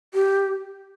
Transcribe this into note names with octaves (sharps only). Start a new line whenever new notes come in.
G4